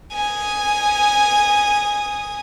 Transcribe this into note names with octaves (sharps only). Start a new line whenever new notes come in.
G#5 D#6